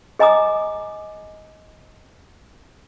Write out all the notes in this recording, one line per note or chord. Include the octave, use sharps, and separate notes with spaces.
G#4 D#5 G#5 A#5 D6 D#6